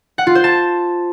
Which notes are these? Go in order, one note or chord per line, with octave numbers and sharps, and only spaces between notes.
F#5
F4
C5
A5